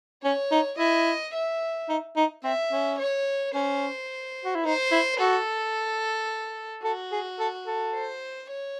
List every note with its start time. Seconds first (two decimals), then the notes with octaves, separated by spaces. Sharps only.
0.24 C#4 C#5
0.51 D#4
0.78 E4 D#5
1.34 E5
1.89 D#4
2.16 D#4
2.44 C4 E5
2.72 C#4
2.99 C#5
3.54 C#4 C5
4.45 F#4
4.55 E4
4.64 D#4 C5
4.91 E4
5.20 F#4 A4
6.84 F#4 A4
7.12 G#4
7.39 A4
7.67 A4
7.95 C5
8.50 C#5